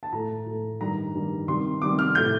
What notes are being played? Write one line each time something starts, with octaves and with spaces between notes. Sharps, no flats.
A5
A2 A3 A#5
A2 A3
G2 D#3 G3 A#5
G2 D#3 G3
C3 D#3 G3 C6
C3 D#3 G3 D6
F6
A2 A3 G6